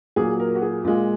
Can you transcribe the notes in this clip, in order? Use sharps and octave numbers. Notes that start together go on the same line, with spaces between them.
A#2 F#3 G#4
A#4
F#4
G#4
A#2 G#3 F4